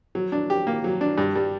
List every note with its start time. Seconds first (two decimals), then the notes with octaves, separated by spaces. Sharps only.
0.15 F#3
0.32 D4
0.50 G4
0.67 A#3
0.84 F#3
1.01 D4
1.18 G2
1.35 G3